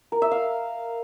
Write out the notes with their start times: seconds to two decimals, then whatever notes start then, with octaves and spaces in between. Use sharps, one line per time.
0.12 A#4
0.22 E5
0.31 F5